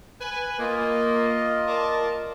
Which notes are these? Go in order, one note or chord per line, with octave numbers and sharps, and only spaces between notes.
B4 G#5 B5
A#3 F4 D#5
A#4 D5 A5